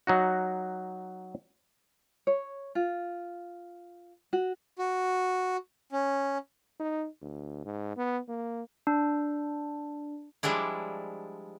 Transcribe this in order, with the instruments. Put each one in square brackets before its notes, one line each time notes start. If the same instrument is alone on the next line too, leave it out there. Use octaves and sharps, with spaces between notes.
[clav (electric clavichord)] F#3 D#4 F#4
[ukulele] C#5
F4
F#4
[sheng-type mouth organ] F#4
C#4
[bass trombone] D#4
D2
G#2
B3
A#3
[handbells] D4
[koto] F3 G3 G#3 D4 E4